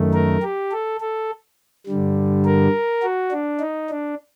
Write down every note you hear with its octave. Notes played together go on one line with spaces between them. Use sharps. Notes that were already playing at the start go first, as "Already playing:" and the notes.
Already playing: F#2 D#3 A3
A#4
G4
A4
A4
G2 D3 G3
A#4
F#4
D4
D#4
D4